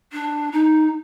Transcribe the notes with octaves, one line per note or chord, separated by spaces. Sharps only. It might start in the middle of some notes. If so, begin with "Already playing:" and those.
D4
D#4